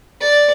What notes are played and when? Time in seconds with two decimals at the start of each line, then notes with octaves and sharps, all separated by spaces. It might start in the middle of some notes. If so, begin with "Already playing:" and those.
0.21 D5